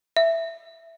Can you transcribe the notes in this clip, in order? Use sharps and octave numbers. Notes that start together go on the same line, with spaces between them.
E5